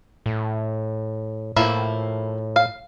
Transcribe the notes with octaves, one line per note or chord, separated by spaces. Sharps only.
A2
A2 F3 A#3 E4
F5